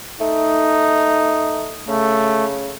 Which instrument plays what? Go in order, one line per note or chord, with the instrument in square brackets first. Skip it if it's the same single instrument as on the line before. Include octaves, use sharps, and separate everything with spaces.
[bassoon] A3 [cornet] D#4
[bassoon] C#3 [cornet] A3